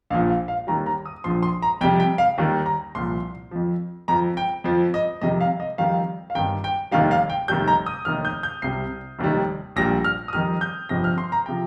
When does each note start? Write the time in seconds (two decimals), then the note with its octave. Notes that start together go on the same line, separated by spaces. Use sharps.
0.10 A#1 F5
0.13 A#2 F3
0.30 F5
0.48 F5
0.67 D#2 D#3 G3 A#5
0.86 A#5
1.06 D#6
1.24 A#1 A#2 F3 C6
1.43 C6
1.62 A#5
1.81 F2 C3 G3 G5
2.00 G5
2.18 F5
2.38 D#2 D#3 G3
2.66 A#5
2.95 C2 A#2 F3 C6
3.51 F2 F3
4.08 F2 F3 A#5
4.37 G5
4.64 F2 F3
4.94 D#5
5.21 F2 C3 D#3 G3 D#5
5.41 F5
5.60 D#5
5.78 F2 D#3 G3 F5
6.30 F5
6.35 G1 G2 D#3 G5
6.64 G5
6.91 F1 D#2 D#3 G3 F5
7.11 F5
7.30 G5
7.48 F1 D#2 D#3 G3 G6
7.68 A#5
7.86 D#6
8.05 F1 D#2 D#3 F6
8.25 G6
8.43 G6
8.62 C2 C3 G3 C7
9.19 F1 D#2 D#3 G3
9.76 A#1 A#2 G3 A#6
10.04 F6
10.28 D#6
10.33 F2 D#3 G3 F6
10.61 G6
10.89 G1 F2 C3 F3 A#6
11.04 F6
11.18 C6
11.32 A#5
11.46 C3 F3 G5